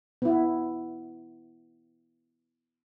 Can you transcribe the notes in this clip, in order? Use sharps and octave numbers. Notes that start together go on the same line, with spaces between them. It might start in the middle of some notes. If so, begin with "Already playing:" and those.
B3 E4